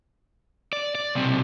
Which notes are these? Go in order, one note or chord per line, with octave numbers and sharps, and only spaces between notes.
D5
D5
B1 C3